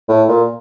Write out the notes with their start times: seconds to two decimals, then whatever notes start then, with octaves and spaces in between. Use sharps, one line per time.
0.09 A2
0.28 A#2